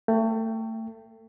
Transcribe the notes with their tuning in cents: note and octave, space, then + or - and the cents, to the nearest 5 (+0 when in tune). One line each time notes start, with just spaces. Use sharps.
A3 +30 G5 +0